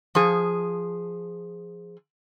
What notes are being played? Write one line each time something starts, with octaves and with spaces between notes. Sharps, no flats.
F3 G#4